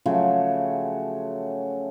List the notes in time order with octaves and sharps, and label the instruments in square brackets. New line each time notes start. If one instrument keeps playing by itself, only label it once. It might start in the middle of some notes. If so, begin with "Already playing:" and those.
[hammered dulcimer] C#3 F3 F#3 A3